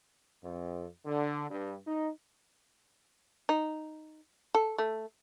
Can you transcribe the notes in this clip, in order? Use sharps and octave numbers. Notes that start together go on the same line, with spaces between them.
F2
D3
G2
D#4
D#4
A4
A3